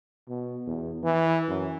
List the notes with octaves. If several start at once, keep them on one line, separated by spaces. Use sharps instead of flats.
B2
E2
E3
F#2